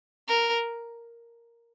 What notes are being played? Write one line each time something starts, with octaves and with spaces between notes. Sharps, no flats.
A#4